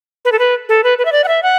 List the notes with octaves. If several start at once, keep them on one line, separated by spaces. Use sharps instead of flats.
B4
A4
B4
A4
B4
B4
E5
D5
F#5
E5
F#5